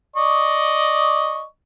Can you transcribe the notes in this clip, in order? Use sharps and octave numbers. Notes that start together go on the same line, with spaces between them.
D5 D#5 C#6